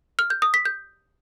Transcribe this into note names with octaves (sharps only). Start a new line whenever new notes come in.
F6
G6
D#6
B6
G6